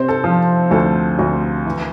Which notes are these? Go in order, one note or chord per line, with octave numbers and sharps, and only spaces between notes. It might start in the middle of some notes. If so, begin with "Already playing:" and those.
Already playing: C3 C4 C5
A4
F3
D2 A4
D2
E3